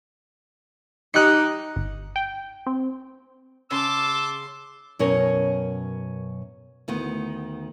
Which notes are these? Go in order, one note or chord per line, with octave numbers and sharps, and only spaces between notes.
D#4 G4 F#6 C#7
G1
G5
C4
C#3 C#4 A5 C6 D6 E6
F#2 B2 C#4 A#4 C#5
D2 D#3 B3